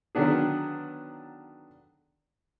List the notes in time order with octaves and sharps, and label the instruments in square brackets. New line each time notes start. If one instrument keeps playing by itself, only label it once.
[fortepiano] D3 D#3 F#3 B3 D4 G#4